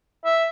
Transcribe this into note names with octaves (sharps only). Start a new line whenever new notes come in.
E5